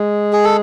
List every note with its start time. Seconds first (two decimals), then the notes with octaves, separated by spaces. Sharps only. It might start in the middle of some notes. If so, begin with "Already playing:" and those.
Already playing: G#3
0.33 G#4
0.44 A4